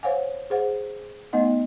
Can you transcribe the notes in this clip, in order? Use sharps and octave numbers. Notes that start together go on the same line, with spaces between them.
C5 C#5 F5 F#5 G#5
G#4 C5 F#5
A3 B3 D#4 D#5 F#5